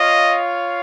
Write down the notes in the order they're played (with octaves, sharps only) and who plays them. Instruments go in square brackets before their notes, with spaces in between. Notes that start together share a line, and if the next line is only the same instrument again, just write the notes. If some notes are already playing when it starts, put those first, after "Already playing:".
Already playing: [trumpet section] F4 C#5 F5 [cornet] D#5